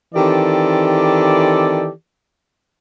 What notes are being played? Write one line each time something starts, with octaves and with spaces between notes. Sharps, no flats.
D#3 E3 C4 G4 A4 D5